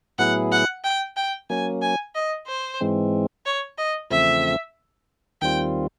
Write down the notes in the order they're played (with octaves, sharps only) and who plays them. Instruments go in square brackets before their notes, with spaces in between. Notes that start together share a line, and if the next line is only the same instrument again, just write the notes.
[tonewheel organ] A2 F#3 B3 E4 G#4 [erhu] F#5
[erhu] F#5
G5
G5
[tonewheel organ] F#3 A#3 C#4 [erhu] G#5
[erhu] G#5
D#5
C5
[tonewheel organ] G#2 E3 G#3 C4
[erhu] C#5
D#5
[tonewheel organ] E2 C#3 F3 A3 C4 [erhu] E5
[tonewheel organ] D#2 D#3 G3 C4 F4 [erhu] G5